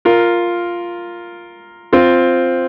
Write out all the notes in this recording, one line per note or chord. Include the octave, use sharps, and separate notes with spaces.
F4 A#4
C4 F4